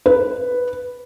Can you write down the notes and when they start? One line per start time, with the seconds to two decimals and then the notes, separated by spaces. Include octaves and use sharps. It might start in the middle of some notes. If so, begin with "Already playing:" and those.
0.06 B4